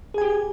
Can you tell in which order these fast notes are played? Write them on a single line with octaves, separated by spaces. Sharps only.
G#4 G#5 G4